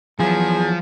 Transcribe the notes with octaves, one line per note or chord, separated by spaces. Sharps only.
E2 F3 F#3 G#4